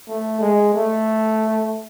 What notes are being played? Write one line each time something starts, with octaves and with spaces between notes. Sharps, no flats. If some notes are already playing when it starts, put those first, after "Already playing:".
A3
G#3
A3